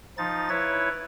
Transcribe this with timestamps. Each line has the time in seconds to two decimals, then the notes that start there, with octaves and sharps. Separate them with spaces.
0.18 F3 D#4 A6
0.49 E4 B4 C#5